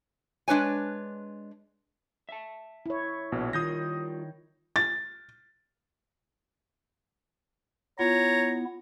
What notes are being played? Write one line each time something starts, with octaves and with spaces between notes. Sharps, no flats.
G#3 D4 B4 C#5 G#5
E5 A5
E4 C#5
A#1 B2
D#3 G3 F4 D#6 G6 A#6
A6
B3 E4 F4 C#5 A#5